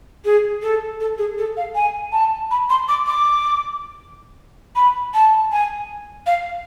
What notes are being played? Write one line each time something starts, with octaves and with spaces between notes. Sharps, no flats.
G#4
A4
A4
G#4
A4
F5
G#5
A5
B5
C6
D6
D6
B5
A5
G#5
F5